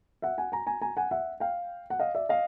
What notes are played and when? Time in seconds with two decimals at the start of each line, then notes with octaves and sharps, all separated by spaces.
0.22 E5 F#5
0.38 F#5 G#5
0.52 G#5 A#5
0.67 G#5 A#5
0.82 G#5 A#5
0.97 F#5 G#5
1.11 E5 F#5
1.40 F5 G5
1.90 F#5
2.00 D#5 F5
2.15 D5 E5
2.29 D#5 F5